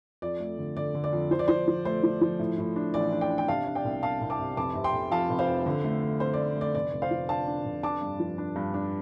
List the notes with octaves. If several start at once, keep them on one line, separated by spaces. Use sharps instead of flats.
F2 D5
A3
D3
D3 D5
D3
D5
F2
F3 C5
D5
F3 C5
F3
A3 C5
F3
F3
A2
A2
D4
A1 D5
D4
D5 G5
D4
G5
C3 F5 A5
D4
D5 G5
C2
C2 F5 A5
C2
A5 D6
C3
F1 A5 D6
C3
G5 C6
F1
F2 F5 A5
F1
C5 F5
F2
D3
A3
A3
C4 C5
A3 D5
A3 D5
F1 D5
F1
C5 F5
F3
D4 F5 A5
D4
F1
D4 A5 D6
G2
F3
D4
G2
D4